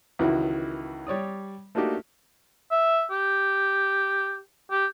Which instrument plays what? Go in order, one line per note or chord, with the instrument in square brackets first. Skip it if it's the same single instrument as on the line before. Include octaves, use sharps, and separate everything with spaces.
[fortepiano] C#2 D#3 E3 E4 F#4
G3 C#5 D5 D#6
A3 A#3 D4 D#4 F#4 G4
[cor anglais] E5
G4
G4